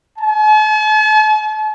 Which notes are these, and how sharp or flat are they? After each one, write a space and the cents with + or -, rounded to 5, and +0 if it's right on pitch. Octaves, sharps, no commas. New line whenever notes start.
A5 -45